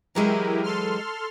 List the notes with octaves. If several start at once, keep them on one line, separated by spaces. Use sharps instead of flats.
E3 F#3 G#3 E4 G4 A#4
A4 C6 F6